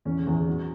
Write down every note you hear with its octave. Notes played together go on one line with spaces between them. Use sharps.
E2 C#4
E2
F#3